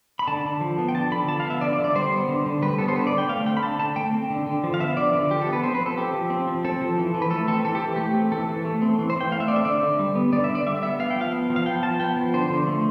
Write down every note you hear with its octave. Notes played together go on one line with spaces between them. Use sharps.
B5
D3 A5
D3
F3
B3
G5
D3 A5
D3 B5
F3 A5
F5
B3
E5
D3 D5
D5
D3
D5
G3 C5
B3
D3
D3
G3 B4
B3 A4
C5
D3 B4
D5
D3
G5
A3 F5
C4 G5
B5
D3 A5
D3 A5
A3 G5
C4
D3
D3
F3
F5
B3 E5
D3 D5
D3
F3 G4
A4
B3
B4
C4 C5
B4
F3
A4
C4 G4
F3
C4
F3
C4 A4
F3
E3
E3
B4
A3 A4
C4 A4
E3 A4
G4
E3
A3 G4
C4
E3 A4
E3
A3
C4
E3
C5
E3 G5
A3 F5
E5
C4 D5
E5
D3 D5
D3
G3
B3
D3 D5
E5
D3
D5
G3 E5
B3 E5
B3 F5
G5
F3 F5
B3
F3
F5
B3 G5
F3 A5
B3 G5
F3
D3 C5
D3
A3